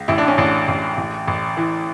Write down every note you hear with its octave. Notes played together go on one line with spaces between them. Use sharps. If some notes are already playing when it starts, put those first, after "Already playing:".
Already playing: C#2
A1 E4
D4
C#4
A1 D4
A1
A1
A1
E3